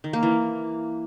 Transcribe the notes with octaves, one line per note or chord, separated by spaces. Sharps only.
D#3
A#3
E3